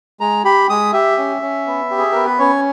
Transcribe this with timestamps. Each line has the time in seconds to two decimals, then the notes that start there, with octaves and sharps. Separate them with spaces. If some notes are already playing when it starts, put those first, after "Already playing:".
0.20 G#3 A#5
0.45 G4 B5
0.69 G#3 D#6
0.93 G4 E5
1.18 C#4
1.42 C#4
1.67 B3
1.90 G4
1.98 G#4
2.12 B3 A#4
2.26 B4
2.39 C#4 C#5